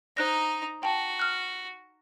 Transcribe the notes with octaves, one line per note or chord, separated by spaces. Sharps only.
D#4 C5 A#5 F#6 A#6
F#4 G5 A5
F6 F#6